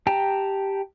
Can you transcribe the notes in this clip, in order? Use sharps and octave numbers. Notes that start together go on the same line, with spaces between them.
G4 G5 A5 A#5